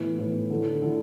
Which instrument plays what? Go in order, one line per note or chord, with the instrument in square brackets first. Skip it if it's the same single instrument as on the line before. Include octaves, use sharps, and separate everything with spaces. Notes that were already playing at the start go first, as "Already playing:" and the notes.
Already playing: [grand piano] A2 E3 B3
A2 E3 B3
D3 A3 E4
D3 A3 E4